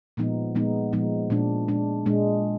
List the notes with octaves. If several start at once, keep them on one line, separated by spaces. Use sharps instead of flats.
A#2 F3 G#3 B3 D#4
A#2 F3 G#3 B3 D#4
A#2 F3 G#3 B3 D#4
A#2 G#3 D4
A#2 G#3 D4
A#2 G#3 D4